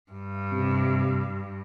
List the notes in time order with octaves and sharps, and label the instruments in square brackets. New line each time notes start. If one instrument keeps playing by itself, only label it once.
[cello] G2
[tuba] C3